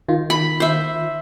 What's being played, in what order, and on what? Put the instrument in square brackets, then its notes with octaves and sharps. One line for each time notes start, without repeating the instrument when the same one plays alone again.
[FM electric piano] D#3 F4
[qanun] B5
C5 E5